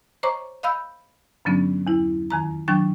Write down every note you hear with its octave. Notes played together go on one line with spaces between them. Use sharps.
C5 C#5 D#5 A#5 C#6 D6
D#5 F5 B5 E6 G6
G2 D3 F#3 B3 C#4 D4
E2 E4
F2 D#3 A#5
D#3 F#3 D4 G5 C#6